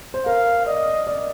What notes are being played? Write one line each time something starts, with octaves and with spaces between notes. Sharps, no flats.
C5
A#4 F5
D5 D#5
D5